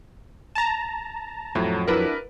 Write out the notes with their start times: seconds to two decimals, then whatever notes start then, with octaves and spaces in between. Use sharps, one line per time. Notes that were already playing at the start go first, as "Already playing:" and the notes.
0.55 A5 A#5
1.55 F2 A2 F#3
1.88 D4 E4 F#4 A#4 B4